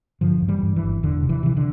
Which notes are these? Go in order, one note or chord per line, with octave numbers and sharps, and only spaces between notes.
G2 D3 F3
G2
E3 G3
G2
E3
G1
E1 D3
C3
E3
C3 E3
D3